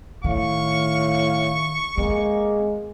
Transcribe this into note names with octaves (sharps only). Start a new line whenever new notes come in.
A2 D#3 F5 C#6
G#3 A#3 C4